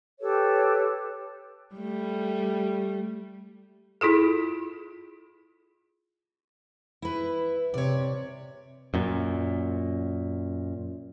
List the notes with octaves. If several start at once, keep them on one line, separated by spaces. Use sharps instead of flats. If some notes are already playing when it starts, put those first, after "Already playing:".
G4 A4 B4 C#5
G3 A3
E4 F4 G#4 A4
E4 B4
C3 C#5 D5
F#2 A#2